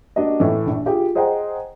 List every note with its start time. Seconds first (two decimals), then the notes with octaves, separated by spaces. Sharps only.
0.16 A#3 D4 F#4 G4 D#5
0.40 A2 E3
0.67 A#1
0.86 F4 G4 G#4 G5
1.15 G#4 C5 D#5 F#5 G5 A#5